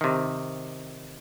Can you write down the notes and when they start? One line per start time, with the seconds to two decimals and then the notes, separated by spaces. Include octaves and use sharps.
0.01 C3 D#3